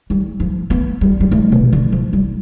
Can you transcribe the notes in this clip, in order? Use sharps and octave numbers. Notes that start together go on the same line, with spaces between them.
G3
F3
B3
G3
G3
A3
B2
D3
F3
G3